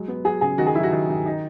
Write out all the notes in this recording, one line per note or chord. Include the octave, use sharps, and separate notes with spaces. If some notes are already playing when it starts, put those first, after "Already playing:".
Already playing: F#3 G#3
B3
F#3 G#4
C#3 G#4
D#3 F#4
G#4
F#3 E4
F#4
D#3
D#3
D#4